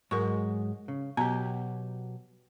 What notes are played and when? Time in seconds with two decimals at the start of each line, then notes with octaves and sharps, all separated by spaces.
0.11 G#2 F#3 G#3 A#4 C#6
0.88 C#3
1.17 B2 F#3 B3 G4 A#5